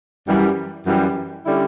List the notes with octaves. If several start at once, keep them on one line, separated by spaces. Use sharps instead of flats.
F#2 E3 G3
F#2 E3 G3
D3 G3 C#4 E4